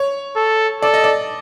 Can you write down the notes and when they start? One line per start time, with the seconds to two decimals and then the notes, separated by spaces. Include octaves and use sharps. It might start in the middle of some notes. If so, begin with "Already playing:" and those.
Already playing: C#5
0.36 A4
0.82 A4 D5
0.94 D#5
1.04 D5